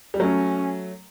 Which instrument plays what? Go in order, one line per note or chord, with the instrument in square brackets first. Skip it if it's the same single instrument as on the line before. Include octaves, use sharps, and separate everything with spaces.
[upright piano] G3
[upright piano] F#3 A3 [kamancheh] C#4